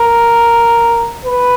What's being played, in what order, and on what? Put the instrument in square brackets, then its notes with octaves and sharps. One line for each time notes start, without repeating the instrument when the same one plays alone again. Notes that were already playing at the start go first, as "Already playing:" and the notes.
Already playing: [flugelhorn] A#4
B4